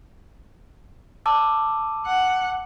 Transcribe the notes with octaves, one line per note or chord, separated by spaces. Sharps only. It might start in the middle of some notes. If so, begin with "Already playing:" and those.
A5 D6 E6
F#5